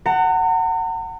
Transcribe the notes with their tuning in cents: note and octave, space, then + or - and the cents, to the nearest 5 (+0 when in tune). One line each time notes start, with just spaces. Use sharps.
F#5 +15 A#5 -45